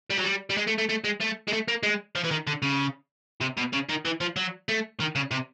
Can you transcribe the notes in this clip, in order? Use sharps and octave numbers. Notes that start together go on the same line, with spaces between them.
G3
F#3
G3
G3
G#3
A3
A3
A3
G#3
A3
G#3
A3
A#3
G#3
F3
E3
D#3
D3
C#3
C3
B2
C#3
D#3
E3
F3
F#3
A3
D#3
C#3
C3